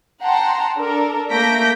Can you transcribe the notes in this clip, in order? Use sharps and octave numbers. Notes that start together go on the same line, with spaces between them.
F#5 G5 A5 A#5 C6
D4 A4 A#4
A3 A#3 G6 A#6 B6 D7